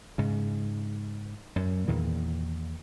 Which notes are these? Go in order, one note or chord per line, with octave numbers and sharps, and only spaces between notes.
G#2 C#3
F#2
E2 A#2 D#3 E3